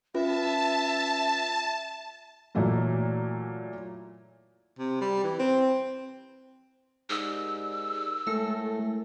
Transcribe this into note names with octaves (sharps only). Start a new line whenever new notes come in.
C#4 F4 B4 E5 A5
A#2 E3 F#3 A3 A#3
C3
G3
E3
C4
G#2 G4 A#4 D5 E6
A2 G#3 A3 A#4 E5